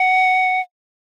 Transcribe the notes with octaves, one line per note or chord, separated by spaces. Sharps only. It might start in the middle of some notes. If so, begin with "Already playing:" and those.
Already playing: F#5